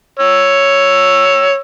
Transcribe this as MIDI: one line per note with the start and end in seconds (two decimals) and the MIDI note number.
0.19 1.60 73
0.19 1.60 88